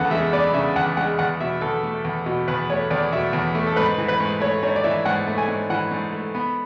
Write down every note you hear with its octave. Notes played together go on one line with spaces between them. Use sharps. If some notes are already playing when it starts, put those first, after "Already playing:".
Already playing: E2 C#3 A4 F#5
G#3 E5
B3 D5
C#3 E5
E2 F#5
G#3 F#5
E2 F#5
B2 E5
E2 A4
A3
E2
B2
E2 B4
A3 C#5
E2 D5
B2 E5
E2
A3
A4
G#2 B4
E3
B4
G#2
A3 C#5
G#2 C#5
D5
E3 E5
G#2 F#5
A3
G#5
G#2
E3 F#5
G#2
A3
B3